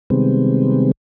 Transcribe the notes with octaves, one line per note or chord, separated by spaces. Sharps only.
C3 D#3 G3 G#3 B3 C4